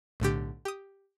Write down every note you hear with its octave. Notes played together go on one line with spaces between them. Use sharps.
B1 A2 D3 G4
G4 D#6